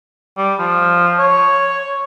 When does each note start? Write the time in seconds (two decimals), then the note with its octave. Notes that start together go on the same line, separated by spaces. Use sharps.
0.37 G3
0.59 F3
1.19 C#5